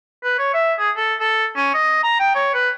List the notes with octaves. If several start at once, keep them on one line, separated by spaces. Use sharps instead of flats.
B4
C#5
E5
G#4
A4
A4
C#4
D#5
A#5
G5
C#5
B4